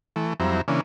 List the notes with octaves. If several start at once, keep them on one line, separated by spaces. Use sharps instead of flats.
E3 A3
F2 F#3 G3 C4 E4 A#5
C#3 E3 A#3 C#4 D4